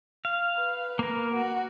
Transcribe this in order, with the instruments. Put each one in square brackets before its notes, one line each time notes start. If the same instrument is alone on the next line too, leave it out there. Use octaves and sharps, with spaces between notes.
[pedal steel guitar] F5
[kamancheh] B4
[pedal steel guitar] A#3 A#4
[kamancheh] F#4